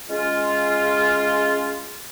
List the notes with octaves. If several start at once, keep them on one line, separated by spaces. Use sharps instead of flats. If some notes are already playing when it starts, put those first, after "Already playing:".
G#3 C#4 F4